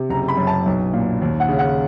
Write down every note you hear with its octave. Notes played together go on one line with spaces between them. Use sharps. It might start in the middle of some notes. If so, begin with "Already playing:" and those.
Already playing: C3
F#1 A#5
B5
F#2
A5
B1
A#2
D#2
F#5
C#3
F#5